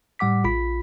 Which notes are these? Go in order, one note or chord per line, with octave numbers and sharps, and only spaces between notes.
A2 G3 F#5 D6 B6
A#1 F4 B5 B6